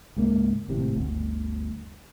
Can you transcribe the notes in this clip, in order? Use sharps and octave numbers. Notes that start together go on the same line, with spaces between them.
C#2 G#2 A#3
G#1 A2 C3
G1 D2